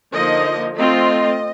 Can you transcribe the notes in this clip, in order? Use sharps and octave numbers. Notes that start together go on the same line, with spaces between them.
D3 F3 A#3 D#4 D#5
A3 C4 F4 D#5